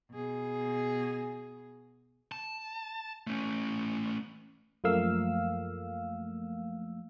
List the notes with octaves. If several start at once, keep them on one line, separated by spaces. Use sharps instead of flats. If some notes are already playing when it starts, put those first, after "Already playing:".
B2 G#4
A5
A3 C#4
F#2 F3 A3 A#3 F5 E6